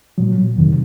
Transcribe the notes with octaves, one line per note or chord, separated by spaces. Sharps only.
A#2 F#3
F2 C3 D#3 F#3